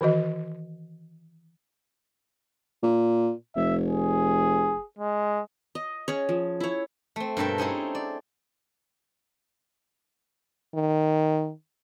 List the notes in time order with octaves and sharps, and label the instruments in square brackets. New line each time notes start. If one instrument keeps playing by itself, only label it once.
[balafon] D#3 E3 F#4 D#5
[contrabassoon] A#2
[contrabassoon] F1 [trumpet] E5
[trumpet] G#4
G#3
[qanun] D#5
C#4 G#4 C#5
F3
E4 C#5
[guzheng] A3 C4
G2 B2 A#3 A4 E5 G5
C4 C#4 D#4 E4 G#4 A4
D5
[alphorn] D#3